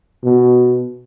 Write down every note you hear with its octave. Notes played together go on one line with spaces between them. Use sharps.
B2